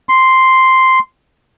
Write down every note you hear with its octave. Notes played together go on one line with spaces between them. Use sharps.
C6